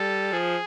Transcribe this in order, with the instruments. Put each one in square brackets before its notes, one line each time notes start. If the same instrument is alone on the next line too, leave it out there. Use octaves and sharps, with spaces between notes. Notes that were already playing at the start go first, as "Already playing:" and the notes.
Already playing: [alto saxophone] G3 [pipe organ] A4
[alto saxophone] F3 [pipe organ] G#4